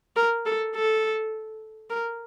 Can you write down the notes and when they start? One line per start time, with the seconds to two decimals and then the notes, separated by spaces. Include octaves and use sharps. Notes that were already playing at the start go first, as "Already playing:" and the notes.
0.16 A#4
0.46 A4
0.75 A4
1.90 A#4